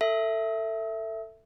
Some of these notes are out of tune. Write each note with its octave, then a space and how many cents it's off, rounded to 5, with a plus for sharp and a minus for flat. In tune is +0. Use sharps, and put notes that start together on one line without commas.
A4 +25 E5 +0